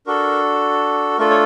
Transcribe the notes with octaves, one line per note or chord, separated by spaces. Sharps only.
D4 F#4 A4 A#4
A3 D4 F4 A4 A#4
C#5